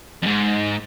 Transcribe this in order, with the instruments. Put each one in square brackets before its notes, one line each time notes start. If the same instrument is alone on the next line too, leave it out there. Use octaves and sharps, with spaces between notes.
[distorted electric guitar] F2 G#2